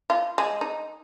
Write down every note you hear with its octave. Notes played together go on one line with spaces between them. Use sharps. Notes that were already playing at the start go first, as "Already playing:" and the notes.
F4
G#3
D#4